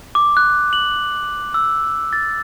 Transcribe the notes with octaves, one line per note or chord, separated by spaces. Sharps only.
D6
F#6
F#7
E6
A6